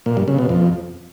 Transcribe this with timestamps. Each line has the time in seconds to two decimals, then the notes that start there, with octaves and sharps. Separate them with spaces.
0.06 A#2
0.17 G2
0.28 C#3
0.38 B2
0.49 F2